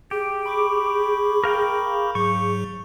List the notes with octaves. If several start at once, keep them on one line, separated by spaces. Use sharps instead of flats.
G4 G#4
B5 C#6 D6
A#4 F5 G5
G#2 F#3 C#6